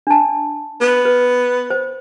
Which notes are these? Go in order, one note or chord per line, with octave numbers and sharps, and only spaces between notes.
D4 A5
B3 B4
B4
C5